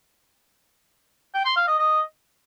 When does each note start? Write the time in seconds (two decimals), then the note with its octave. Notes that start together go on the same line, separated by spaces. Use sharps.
1.34 G5
1.45 C6
1.56 F5
1.67 D#5
1.79 D#5